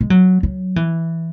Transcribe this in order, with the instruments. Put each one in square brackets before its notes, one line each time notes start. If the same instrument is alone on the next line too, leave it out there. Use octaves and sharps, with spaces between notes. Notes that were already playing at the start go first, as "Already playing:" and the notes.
[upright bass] G#3
F#3
F#3
E3